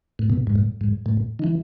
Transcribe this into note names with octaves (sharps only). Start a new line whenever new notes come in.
A2
B2
G#2
A2
G#2
A2
D#3
E3